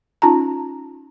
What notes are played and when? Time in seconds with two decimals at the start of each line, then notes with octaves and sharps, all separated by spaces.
0.22 C#4 D#4 F4 A5 A#5